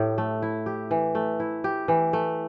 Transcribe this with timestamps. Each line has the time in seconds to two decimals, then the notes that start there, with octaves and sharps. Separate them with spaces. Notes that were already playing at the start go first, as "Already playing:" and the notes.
Already playing: A2 E4 G4
0.18 A3
0.42 E4
0.66 G4
0.91 E3
1.15 A3
1.40 E4
1.64 G4
1.88 E3
2.13 A3